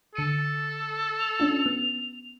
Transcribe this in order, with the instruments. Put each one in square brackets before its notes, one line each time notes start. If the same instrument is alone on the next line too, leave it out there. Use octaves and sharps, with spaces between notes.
[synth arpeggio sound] D3 C#7 D#7 [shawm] A4
[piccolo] F7
[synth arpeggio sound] C#4 D4 F4
B3